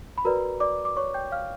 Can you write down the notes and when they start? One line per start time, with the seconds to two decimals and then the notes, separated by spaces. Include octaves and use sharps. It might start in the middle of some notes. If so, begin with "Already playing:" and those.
0.18 B5
0.25 F#4 A#4 B4 D5 A#5
0.60 D5 D6
0.85 D6
0.97 C#5 C#6
1.14 G5 G6
1.32 F5 F6